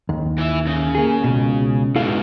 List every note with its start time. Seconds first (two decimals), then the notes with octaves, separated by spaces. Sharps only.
0.09 D#2
0.38 E3 E5
0.66 C#3
0.95 A#3 G#4
1.24 C#2 B2
1.96 G#2 B2 E4 A4 F5